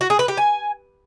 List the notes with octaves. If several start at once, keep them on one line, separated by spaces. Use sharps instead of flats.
F#4
G#4
B4
G4
G#5